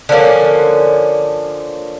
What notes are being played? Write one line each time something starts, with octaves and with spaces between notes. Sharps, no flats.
D3 F3 A#3 C#4